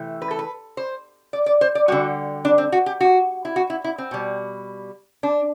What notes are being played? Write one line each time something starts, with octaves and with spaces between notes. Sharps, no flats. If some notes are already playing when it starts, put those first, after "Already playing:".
Already playing: C3 E3 A3
B4
A4
B4
C5
D5
D5
C5
D5
D3 G3 F#4
D4
C4
F#4
G4
F#4
E4
F#4
E4
E4
C4
B2 G3
D4